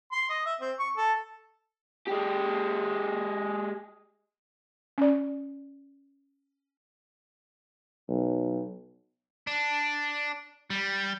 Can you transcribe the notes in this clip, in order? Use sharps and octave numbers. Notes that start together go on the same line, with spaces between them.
C6
D#5
E5
C4
C#6
A4
G#3 G4
C#4 D5
B1
D4
G3